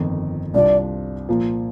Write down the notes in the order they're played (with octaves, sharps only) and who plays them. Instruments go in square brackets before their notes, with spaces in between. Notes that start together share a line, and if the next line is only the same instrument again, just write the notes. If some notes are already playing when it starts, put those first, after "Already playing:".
Already playing: [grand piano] G1 F2 D#3
[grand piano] C2 C3 G3 D4 F4 [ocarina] D5
[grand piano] A#2 F3 A#3